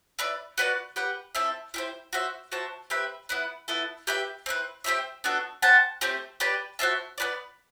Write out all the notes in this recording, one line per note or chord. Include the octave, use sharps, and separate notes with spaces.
E4 B4 D5
F#4 B4 D5 F#5
G4 B4 F#5
C4 E4 A4 E5
E4 G4 C5
F#4 C5 E5
F#4 C5 E5 A5
C4 G4 B4 E5
B3 E4 B4
B3 E4 A4
G4 B4 E5 G5
C4 E4 B4
C4 G4 C5 E5
B3 D4 F#4 A4
G4 C5 F#5 A5
A3 C4 G4 C5
G4 B4 D5 A5
F#4 C5 E5 A5
B3 F#4 B4 D5